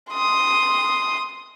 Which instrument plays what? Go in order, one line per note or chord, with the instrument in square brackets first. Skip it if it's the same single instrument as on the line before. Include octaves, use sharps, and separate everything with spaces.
[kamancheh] C6 D#6